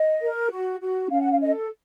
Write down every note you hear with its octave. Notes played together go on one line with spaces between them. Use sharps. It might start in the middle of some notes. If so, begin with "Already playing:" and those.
Already playing: D#5
A#4
F#4
F#4
C#4 F5
F#5
F5
A4 D#5